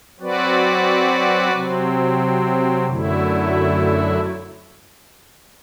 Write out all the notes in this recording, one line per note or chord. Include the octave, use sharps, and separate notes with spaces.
F#3 C4 F#4 B4 D5
C3 F#3 C4
F#2 D3 F#3 A3 E4